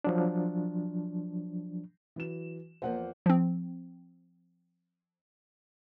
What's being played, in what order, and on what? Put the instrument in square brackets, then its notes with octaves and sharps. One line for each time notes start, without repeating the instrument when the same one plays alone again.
[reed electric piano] F3 F#3 D4
[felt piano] E3 F#3 E7
[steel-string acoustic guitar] E2 F3 A#3 [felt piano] C5 F#5
[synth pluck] F3 C4